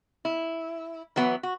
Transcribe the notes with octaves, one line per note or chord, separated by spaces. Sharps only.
E4
E3 F#3 B3 E4
F#4